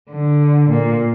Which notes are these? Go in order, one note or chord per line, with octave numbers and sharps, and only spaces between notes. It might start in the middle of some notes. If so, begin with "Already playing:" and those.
D3
A#2